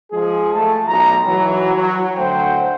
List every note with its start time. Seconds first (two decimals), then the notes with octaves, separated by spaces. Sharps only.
0.12 F3 G#3 G#4
0.55 A3 A5
0.88 B1 A#5
1.26 E3 F#3
1.76 F#3
2.16 D2 A3 C5 F#5 G5